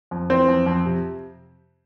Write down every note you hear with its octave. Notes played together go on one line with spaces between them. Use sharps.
F2
E3 C4
F2
F2
C3